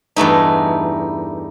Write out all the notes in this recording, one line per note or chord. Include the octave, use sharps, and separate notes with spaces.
E2 G2 A3 D#4